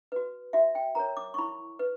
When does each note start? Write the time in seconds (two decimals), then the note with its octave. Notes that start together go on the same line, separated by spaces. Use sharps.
0.12 F#4 B4
0.53 F#4 E5
0.75 G5
0.95 A#4 C#5 A#5
1.17 D6
1.34 C#6
1.38 E4 B5
1.79 B4